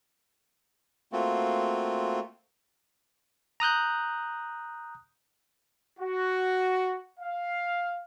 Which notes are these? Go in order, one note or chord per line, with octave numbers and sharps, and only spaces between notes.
A3 A#3 C4 F4 F#4
A#5 D#6 F#6 G6
F#4
F5